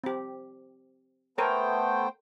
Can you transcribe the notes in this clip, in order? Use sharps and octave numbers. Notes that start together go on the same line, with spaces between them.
C4 G4
A3 B3 A4 A#4 C5 C#5 G5